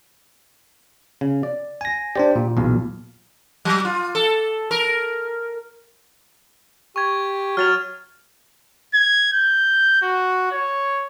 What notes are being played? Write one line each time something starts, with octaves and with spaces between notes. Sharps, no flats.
C#3
D5
G#5 A#6
D4 G4 C5 D5
A#2
B1 E2 F5
F#3
F4
A4
A#4
G4 C#6 G#6
F#3 F6 A6 F7
G#6
G6
F#4
C#5